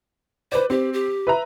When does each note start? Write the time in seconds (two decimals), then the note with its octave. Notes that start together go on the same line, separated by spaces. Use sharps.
0.52 B4 C5 D5
0.70 C4 G4
0.93 G4
1.27 B4 E5 A#5